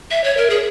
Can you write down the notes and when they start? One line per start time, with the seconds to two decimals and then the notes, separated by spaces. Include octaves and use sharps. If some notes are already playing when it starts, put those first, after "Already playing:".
0.11 E5
0.24 C#5
0.37 A#4
0.50 G#4